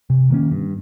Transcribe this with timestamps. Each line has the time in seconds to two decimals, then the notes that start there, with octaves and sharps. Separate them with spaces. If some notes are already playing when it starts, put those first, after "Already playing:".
0.10 C3
0.30 D#3 A#3 C#4
0.51 G2